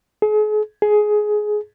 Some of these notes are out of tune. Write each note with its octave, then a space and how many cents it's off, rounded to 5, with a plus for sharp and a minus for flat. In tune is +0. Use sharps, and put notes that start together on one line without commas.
G#4 +40
G#4 +15